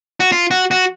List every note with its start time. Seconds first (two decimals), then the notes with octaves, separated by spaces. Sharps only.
0.20 F#4
0.32 F4
0.51 F#4
0.71 F#4